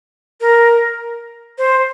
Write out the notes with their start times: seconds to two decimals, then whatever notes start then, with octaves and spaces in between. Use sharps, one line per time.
0.41 A#4
1.58 C5